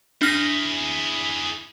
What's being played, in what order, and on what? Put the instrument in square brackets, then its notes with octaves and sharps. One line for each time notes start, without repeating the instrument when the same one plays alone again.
[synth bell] D4 F6 A#6 [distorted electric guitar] E4 G#4